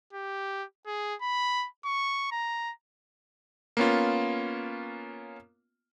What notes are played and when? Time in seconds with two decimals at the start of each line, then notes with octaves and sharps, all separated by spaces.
0.13 G4
0.86 G#4
1.22 B5
1.85 C#6
2.32 A#5
3.77 A#3 B3 C#4 F4